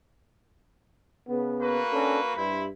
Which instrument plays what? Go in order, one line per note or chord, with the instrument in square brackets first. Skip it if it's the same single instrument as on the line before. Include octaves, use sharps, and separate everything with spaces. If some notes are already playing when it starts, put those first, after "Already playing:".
[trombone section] C#3 B3
[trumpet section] A#3 F#4 B4
[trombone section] C#4 D4 A4
[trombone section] G2 [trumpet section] E4 C5 B5